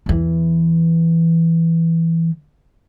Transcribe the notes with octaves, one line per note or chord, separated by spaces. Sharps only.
E2 E3